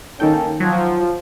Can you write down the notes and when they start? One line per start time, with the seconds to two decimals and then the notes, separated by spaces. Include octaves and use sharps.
0.20 D#3 A#3 C#4 D#4 A4 G5
0.60 F3 F#3